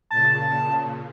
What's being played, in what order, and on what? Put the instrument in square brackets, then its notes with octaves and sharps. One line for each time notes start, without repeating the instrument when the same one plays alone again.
[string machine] A#2 C#3 [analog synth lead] A5